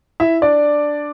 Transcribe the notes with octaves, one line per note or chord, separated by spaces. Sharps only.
E4 E5
D4 D5